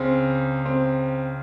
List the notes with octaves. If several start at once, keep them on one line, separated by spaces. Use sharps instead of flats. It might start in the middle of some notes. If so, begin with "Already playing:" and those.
Already playing: C#2 C#3 C4
C4